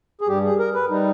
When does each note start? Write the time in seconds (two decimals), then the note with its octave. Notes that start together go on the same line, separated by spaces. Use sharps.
0.21 G#4
0.28 G2 G3 G4
0.44 G#4
0.59 A#4
0.75 B4
0.90 G3 D#4